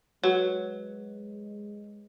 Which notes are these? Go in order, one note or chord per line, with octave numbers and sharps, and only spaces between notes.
F#3 G#3 B4 C#5